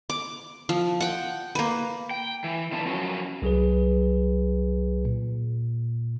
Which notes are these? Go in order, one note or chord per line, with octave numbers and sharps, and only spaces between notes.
D6
F3
F#5 G5
A#3 B4
G5
E3
D3 C4 D#4 B4 A5
F3 C#4 F#4
C2 F#3 G#4 B4
A#2